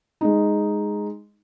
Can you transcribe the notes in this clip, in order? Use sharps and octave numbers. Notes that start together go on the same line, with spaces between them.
G#3 D#4